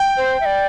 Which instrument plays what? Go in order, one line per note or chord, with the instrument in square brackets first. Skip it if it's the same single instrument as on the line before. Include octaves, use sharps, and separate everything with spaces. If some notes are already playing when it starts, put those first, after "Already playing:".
Already playing: [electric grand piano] G5
[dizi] C5
E5
D5